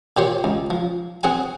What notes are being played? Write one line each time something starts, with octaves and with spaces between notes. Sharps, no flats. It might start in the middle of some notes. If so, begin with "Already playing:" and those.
A#2 G4 C5 C#5
C#2
F3
C4 G#4 F#5 G#5